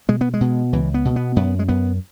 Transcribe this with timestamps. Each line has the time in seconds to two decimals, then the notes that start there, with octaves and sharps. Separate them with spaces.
0.09 B2 G#3
0.21 B3
0.34 G#3
0.41 B2
0.73 C#2 E3
0.94 B3
1.05 B2
1.16 B3
1.36 F#2 B3
1.59 G#3
1.68 F#2 B3